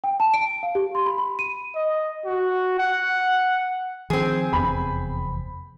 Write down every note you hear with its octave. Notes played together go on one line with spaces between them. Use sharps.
G5
A5
D7
F5
G4
C6
B5
B5
D#7
D#5
F#4
F#5
D#3 F3 C4 G#4
F1 E2 B3 B5